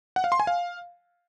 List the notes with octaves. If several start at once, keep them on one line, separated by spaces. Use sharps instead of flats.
F#5
F5
C6
G#5
F5